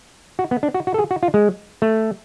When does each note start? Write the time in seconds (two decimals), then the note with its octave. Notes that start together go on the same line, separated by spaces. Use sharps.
0.39 F#4
0.51 B3
0.63 D4
0.74 F#4
0.87 F#4
0.94 A4
0.99 G#4
1.11 F#4
1.23 F4
1.34 G#3
1.82 A3